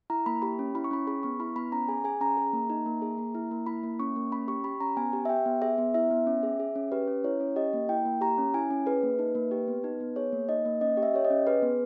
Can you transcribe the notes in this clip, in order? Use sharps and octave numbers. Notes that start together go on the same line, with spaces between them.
E4 A#5
A#3 B5
G4 B5
C#4
E4 B5
C#6
C#4 B5
G#4 B5
B3 C#6
E4 B5
B3 B5
C#4 A#5
G#4 G#5
G#4 G#5
C#4 A#5
G#4
A#3
D#4
A#3
G#4
A#3
E4
A#3
E4 B5
A#3
C#4 C#6
A#3
C#4 B5
G4 C#6
G4 B5
C#4 A#5
B3 G#5
G4
E5
G4 G5
B3
G#4 E5
B3
E4 E5
B3
C#4
G#4
G#4
C#4
G4 B4
C#4
E4 C#5
C#4
G4 D#5
A#3
E4 G5
A#3
G4 A#5
C#4
E4 G#5
C#4
G#4 B4
A#3
D#4
A#3
G4
B3
D#4
B3
G#4 C#5
A#3
D#4 D#5
A#3
C#4 D#5
G4
E5
G4 C#5
D#5
C#4
G#4 B4
B3